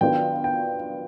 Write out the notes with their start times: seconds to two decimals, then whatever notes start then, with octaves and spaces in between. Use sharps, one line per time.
0.01 D#3 F#3 B3 D4 F4 G5
0.44 G5